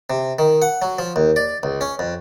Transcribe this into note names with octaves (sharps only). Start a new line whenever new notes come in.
C3
D#3
F#5
F#3
F3
D#2
D5
C#2
C#4
F2